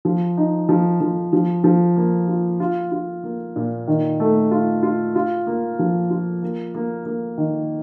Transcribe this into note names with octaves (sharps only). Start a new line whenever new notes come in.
F3
D#4
F3
F3
F3
F3
A#3
F4
F4
F4
A#3
A#2
D#3
A3
F4
F4
F4
A#3
F3
F4
A#3
A#3
A#3
D#3